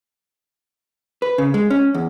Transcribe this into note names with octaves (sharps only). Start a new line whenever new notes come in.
B4
C#3
G#3
C#4
E2